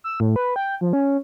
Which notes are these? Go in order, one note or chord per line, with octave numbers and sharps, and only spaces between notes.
E6
A2
B4
G5
F3
C#4